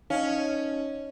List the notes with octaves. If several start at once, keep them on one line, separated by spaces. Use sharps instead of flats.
C#4 D#4 D#5 F5